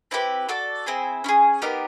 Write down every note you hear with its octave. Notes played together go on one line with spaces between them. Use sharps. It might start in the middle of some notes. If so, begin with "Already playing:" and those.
C4 E4 G4 B4
F#4 A4 D5
C4 E4 G#4 C5
C#4 E4 G#4
B3 D#4 G4 A#4